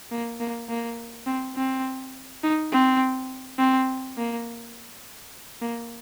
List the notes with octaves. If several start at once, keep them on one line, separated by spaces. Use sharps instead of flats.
A#3
A#3
A#3
C4
C4
D#4
C4
C4
A#3
A#3